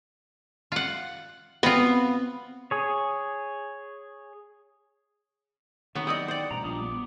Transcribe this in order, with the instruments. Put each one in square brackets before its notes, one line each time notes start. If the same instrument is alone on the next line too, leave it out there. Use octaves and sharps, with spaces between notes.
[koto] F4 F#5
[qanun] B3 [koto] C4 F4
[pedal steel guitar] G#4 C#5
[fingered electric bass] D#3 [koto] F#3 B3 [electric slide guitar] C4 E5 F#5
[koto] E4 D5 D#5 [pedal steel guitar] G4 D#6 [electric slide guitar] F#5
[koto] C5 D5 [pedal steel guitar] G5
[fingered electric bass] A1 G2 B2 [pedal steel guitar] A#5
[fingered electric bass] A#1 F3 [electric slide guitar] G3 D4 [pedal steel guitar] D6 D#6
[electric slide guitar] B3